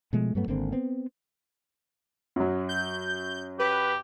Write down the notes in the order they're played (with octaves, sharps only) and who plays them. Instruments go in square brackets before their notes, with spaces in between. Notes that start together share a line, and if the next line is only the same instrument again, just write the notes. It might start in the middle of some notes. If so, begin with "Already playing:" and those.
[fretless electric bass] B2 F3 G#3 A3
G2 F#3 A3 B3
G#1 D3 A#3 C4
B3 C4
[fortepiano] F#2 F#3
[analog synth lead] G6
[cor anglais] G4 [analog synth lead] B4